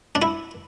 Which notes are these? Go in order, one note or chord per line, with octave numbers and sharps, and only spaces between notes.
D4
E4